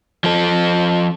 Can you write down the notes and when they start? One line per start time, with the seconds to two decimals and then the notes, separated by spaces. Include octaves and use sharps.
0.24 F3 A4